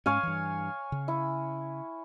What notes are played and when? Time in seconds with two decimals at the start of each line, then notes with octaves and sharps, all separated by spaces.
0.06 G#2 G#3 C#4 C#5 F5 G#5
0.23 G2 E3
0.92 C#3
1.08 E4